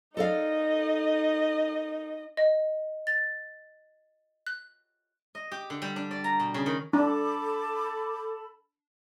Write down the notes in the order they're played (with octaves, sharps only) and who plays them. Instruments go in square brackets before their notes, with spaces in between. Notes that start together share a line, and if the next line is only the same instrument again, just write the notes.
[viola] D#4 [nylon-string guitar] A4 D5 F5 [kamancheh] D#5
[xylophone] D#5
A6
F#6
[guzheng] D#5
G4
D3
G3
D4
D5
A#5
B2
C#3
D#3
[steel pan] D4 [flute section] A4 A5 B5 [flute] D6